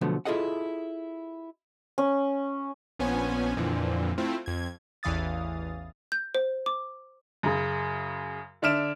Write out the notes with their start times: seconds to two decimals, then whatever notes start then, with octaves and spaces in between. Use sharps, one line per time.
0.01 B2 D3 F3 F#3 A3 B3
0.25 E4 F4 G#4 A4 D#5 F#5
1.98 C#4
2.99 A#1 F3 B3 C#4 G#5
3.57 F2 A#2 D3 E3 F3
4.18 A3 C4 E4 F4
4.46 F2 G#6
5.03 A1 E2 E3 F5 D#6 A6
6.12 G6
6.35 C5
6.66 D6
7.43 F#2 C#3
8.62 D3 D4 E5 F6 D7 E7